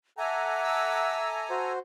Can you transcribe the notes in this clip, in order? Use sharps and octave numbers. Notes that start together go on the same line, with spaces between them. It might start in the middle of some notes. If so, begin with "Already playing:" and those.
A4 E5 F#5 G#5 A#5 D6
E6
F#4 C5